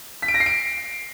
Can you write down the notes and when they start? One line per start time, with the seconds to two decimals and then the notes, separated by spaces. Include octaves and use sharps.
0.22 B6
0.28 D7
0.34 A#6
0.40 C7
0.46 D7